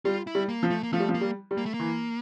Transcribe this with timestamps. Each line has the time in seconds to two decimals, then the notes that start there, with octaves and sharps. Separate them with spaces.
0.05 G3 F4
0.27 E4
0.35 G3
0.49 A#3
0.63 F3
0.71 A3
0.83 A#3
0.92 F3 A3
1.00 G3
1.09 F3
1.14 A#3
1.21 G3
1.51 G3
1.58 A#3
1.66 A3
1.74 A#3
1.79 E3